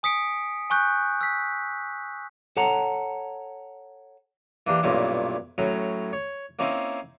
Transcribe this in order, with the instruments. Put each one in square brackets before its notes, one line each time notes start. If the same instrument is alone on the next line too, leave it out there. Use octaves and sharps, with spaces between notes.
[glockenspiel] G#5 D#6 B6 C#7 D7
G#5 C#6 F#6 G6
E6 B6
[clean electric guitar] A4 C#5 F#5 A5 A#5
[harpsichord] E3 A#3 D4 G4
B1 G2 A#2 C#4 E4
A2 F#3 C#4
C#5
A#3 C4 C#4 D#4 E4